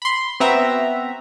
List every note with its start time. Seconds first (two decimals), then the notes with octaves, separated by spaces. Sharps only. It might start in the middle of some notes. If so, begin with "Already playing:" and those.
0.02 B5 C6
0.40 B3 C4 F#4 B4 E5 A#5